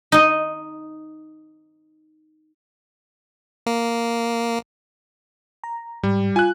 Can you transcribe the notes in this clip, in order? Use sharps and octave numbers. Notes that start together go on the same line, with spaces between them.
D#4 D#5
A#3
A#5
G#2 G3
F4 G#5 F#6